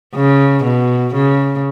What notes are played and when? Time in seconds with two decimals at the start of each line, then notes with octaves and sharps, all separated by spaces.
0.15 C#3
0.64 B2
1.14 C#3